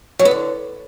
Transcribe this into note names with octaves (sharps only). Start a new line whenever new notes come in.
F#3
B3
D3